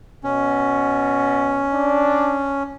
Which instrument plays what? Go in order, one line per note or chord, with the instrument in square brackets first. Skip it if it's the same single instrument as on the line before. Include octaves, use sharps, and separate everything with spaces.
[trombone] B2 [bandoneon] C#4
[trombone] D4